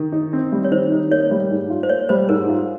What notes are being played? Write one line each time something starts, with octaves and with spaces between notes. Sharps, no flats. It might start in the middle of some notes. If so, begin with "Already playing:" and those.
Already playing: D#3
D#4
C4
G3
C#5
D#3 C5
D#4
A#3 C#5
G3
G#2
F4
C5
A#3 C#5
G3 C5
G#2 A#4
F4